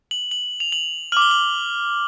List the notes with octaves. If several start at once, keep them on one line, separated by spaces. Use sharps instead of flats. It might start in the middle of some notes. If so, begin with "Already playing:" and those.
F#7
F#7
F7
F#7
D6 F6 F#7
G7
F#7